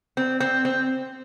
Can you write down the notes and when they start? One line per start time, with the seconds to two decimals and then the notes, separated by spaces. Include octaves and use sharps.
0.17 C4
0.40 C4
0.65 C4